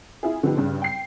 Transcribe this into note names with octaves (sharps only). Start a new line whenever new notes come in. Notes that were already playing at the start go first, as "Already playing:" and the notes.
E4 F4 G#4
D3 F3 B3 D#4 G4
G2 C#3
G5 C7